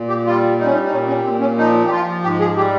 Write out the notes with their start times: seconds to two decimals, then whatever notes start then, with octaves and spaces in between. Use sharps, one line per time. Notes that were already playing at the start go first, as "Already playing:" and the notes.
Already playing: A#2
0.09 G4
0.25 G3 F4
0.58 G3 D#4
0.66 C#4
0.73 D#4
0.84 D#4
0.91 A#2 C#4
1.08 C#4
1.24 A#2 C4
1.40 C#4
1.57 F3 D#4
1.85 G4
1.90 F3 F4
2.23 G#2 G4
2.40 G#4
2.57 G3 G4